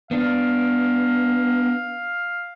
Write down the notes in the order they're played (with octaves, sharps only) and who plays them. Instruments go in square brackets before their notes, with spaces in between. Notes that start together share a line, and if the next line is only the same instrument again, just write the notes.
[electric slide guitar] B3 D4 [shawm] F5